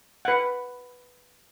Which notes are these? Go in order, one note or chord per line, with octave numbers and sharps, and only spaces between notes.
B4 F#5